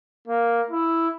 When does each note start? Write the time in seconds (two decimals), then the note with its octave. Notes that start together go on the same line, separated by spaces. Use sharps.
0.28 A#3
0.71 E4